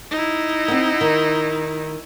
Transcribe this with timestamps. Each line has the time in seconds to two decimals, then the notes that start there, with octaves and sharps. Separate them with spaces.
0.11 D#4 E4
0.68 B3 C4
1.01 D#3